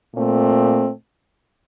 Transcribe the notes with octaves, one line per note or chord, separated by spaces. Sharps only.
A#2 A3 C4